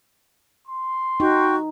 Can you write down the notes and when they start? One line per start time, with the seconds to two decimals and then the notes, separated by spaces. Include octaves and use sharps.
0.68 C6
1.20 D#4 F#4 G5 C#6